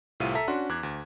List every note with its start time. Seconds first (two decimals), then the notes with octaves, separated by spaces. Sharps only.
0.20 C2 A2 C3 F4 E5 D#7
0.35 A4 E5 A#5 B6
0.48 C#4 D4 F#4 C6
0.69 E2 D6 F#6 G#6
0.83 D2